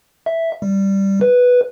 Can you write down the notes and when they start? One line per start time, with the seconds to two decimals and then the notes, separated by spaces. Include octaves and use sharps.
0.26 E5
0.62 G3
1.21 B4